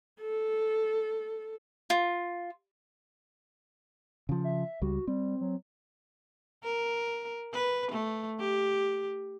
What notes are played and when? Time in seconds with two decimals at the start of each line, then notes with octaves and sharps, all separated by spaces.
0.21 A4
1.90 F4
4.29 C#3 F3
4.44 E5
4.82 C#2 G3 F#4
5.07 G3 C4
5.41 F#3
6.64 A#4
7.53 B4
7.92 A3
8.40 G4